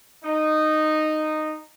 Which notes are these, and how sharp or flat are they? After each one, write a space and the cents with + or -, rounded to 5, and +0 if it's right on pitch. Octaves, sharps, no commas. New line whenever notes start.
D#4 -10